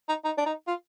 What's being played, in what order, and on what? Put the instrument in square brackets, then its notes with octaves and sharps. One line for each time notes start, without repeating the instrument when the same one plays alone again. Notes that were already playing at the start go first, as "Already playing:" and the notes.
[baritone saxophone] D#4
D#4
D4
D#4
F4